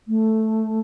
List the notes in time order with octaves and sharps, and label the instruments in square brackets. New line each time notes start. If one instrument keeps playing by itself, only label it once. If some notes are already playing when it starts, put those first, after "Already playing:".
[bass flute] A3